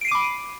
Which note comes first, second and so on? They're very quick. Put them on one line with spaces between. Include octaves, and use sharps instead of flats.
D7 C7 D#7 D6 B5